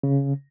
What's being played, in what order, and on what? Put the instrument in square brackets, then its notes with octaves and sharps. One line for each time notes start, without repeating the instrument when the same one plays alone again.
[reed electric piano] C#3